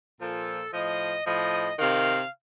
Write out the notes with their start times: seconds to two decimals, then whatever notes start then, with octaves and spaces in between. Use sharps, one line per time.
0.20 A#2 F3 A4
0.73 A2 F3 D#5
1.25 A2 F3 D#5
1.79 C3 D#3 F5